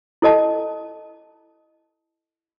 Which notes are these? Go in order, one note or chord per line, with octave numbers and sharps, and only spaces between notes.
E4 A4 D#5 A5